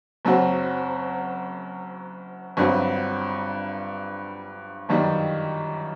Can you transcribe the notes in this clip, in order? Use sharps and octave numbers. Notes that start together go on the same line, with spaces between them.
F#1 F#2 F#3 C4 F#4
G1 G2 F#3 C4
G1 F#2 D#3 G3